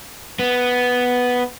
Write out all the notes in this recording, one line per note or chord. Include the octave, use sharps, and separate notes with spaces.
B3